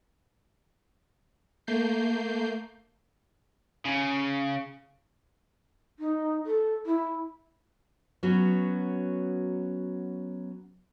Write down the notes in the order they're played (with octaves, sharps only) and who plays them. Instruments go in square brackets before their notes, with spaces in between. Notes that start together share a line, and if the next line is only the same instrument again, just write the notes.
[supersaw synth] A3 A#3 G6 C7
[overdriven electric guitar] C#3
[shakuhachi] D#4
A4
E4
[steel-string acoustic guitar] F#3 B3 C#4 F#4